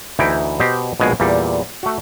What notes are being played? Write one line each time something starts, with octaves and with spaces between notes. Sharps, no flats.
D2 E3 D#4 E4 G5
B2 G4 C5 D#5
A#1 B2 G#3 G#5
E2 A#2 G3
A3 F#4